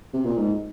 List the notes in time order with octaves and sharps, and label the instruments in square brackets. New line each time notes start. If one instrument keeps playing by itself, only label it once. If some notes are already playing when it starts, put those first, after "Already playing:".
[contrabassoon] C3
A#2
G#2